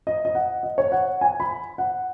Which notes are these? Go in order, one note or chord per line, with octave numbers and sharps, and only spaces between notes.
D#5
D#5
F#5
D#5
C#5
F#5
G#5
B5
F#5